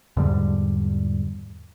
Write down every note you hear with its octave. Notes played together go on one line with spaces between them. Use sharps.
E2 G#2 D3 G3